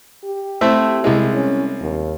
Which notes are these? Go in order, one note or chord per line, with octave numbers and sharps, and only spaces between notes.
G4
A3 C4 E4
C2 G#3 E4
C#4
D#2